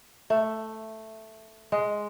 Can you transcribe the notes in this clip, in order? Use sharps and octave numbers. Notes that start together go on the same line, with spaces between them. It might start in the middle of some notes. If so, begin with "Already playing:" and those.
A3
G#3